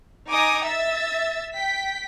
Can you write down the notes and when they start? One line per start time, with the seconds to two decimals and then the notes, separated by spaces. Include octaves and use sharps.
0.29 D#4 G#5 D6 D#6
0.64 E5 E6 A6
1.54 G5 B6